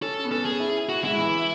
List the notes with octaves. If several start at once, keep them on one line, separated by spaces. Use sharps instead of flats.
C#4 A4
B3
C#4 A4
G#4
E4
F#4
G#3 E4
E3